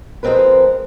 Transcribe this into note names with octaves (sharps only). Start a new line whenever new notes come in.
F3 G#3 A3 C4 A#4 B4